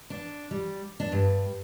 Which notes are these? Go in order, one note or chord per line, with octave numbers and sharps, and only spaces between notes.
D4
G3
D4
G2